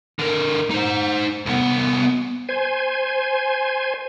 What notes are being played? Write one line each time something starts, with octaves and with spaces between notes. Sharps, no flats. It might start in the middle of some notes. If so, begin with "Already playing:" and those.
D3 A#4
D#4 C5
C2 B3
C5 G#5